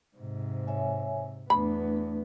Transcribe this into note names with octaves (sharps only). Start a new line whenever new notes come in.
G#2 C3
C#5 E5 G#5
E2 A3 B3 D4 B5